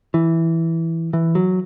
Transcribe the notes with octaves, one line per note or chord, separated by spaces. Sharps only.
E3
E3
F#3